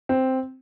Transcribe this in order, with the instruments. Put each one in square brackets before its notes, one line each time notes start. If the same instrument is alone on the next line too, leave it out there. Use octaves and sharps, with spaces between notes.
[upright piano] C4